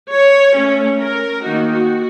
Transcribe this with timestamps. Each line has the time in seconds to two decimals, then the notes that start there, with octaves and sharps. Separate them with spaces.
0.11 C#5
0.55 A3 C#4
0.99 A#4
1.43 D#3 A#3 D#4 F#4
1.72 F#4